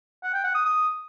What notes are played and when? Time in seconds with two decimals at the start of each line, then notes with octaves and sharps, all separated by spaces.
0.23 F#5
0.34 G5
0.44 F#5
0.55 D#6
0.65 D#6